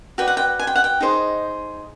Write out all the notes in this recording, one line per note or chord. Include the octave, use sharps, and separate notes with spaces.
F#4 B4 D5 G5
F#5
G5
G#5
G5
F#5
G5
D#4 G#4 C5 D#5